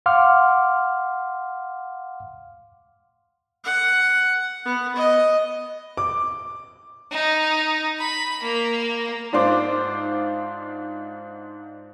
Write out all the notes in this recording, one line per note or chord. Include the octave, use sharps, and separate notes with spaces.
F5 F#5 C6 D6 F6
F#5
B3
D#5
D6
D#4
B5
A#3
G#2 D4 F4 C5 D6